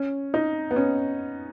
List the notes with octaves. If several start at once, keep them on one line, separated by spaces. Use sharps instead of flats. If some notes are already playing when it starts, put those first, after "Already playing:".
Already playing: C#4
D#4
B3
C#4